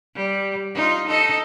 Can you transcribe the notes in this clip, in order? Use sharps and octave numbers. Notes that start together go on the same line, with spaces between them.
G3
D#4 F4
D#4 A4 D#5